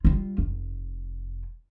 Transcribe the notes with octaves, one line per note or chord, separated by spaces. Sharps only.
G3 F4
F1